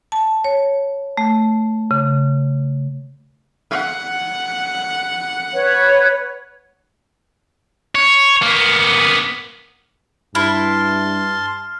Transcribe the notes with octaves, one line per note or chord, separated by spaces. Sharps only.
A5
C#5
A3
C#3
F#5
B4 C#5
C#5
A#3 B3
G2 E4 A5 C6 F6